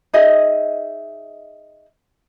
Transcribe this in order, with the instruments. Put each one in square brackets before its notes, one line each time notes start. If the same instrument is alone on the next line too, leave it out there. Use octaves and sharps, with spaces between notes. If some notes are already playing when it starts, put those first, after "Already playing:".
[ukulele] D#4 G#4 D#5 E5